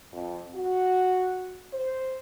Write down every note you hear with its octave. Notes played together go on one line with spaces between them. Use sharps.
F2
F#4
C5